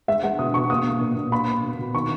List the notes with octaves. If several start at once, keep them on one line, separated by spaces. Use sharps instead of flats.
G#3 E5
G#3 F#5
B2 D#6
B2 C#6
A#3 D#6
A#3
A#2
A#2
A#3 B5
A#3
B2
B2
D#3 C#6